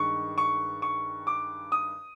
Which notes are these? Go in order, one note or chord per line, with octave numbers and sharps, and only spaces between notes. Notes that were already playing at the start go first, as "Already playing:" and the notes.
Already playing: G2 D#3 G#3 C#6
C#6
C#6
D6
D#6